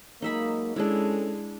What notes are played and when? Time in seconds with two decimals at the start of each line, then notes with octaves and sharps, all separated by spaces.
0.22 F#3 G#3 A#3 D#4 E5 B5
0.76 G#3 C#4 D4 E4 A4